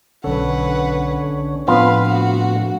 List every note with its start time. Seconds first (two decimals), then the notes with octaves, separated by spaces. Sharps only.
0.24 B1 D3 C#4 A4 B4 F#5
1.68 A2 F3 B3 C4 D4 F4 B4 F5
2.08 F#4